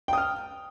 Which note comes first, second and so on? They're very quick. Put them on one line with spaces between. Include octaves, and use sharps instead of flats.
G5 D#6 F6